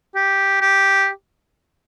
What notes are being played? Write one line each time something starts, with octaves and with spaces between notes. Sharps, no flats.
G4
G4